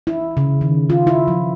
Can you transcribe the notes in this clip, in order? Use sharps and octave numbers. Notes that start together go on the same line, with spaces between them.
E4
C#3
D#3
F4
E4
F3